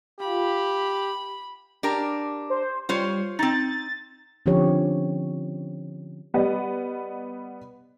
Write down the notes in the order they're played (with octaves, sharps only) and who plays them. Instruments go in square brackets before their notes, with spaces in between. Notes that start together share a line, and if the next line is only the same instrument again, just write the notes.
[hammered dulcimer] F4 [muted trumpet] G4 [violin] B5
[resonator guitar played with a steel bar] D4 G4 A#4
[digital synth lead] C5
[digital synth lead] G3 [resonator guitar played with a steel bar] F4 C5 C#5
[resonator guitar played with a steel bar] C4 D#4 [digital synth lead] A6
[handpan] D3 F3 C4 C#4 G4 C#5
[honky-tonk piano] G3 B3 D#5